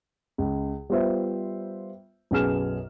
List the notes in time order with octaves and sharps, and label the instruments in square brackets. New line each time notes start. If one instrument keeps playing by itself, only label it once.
[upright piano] C#2
G3 B3 F4 C5 E5
B1 F#2 B3 G#4 F6 E7